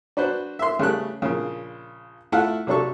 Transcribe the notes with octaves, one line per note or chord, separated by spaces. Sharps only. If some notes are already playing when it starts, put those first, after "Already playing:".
D4 F#4 B4 C5 D5
E5 C6
C#3 G3 A3 F#6
A#1 C#3
A3 E4 F4 F5 F#5
C3 F#3 D4 A4 C#6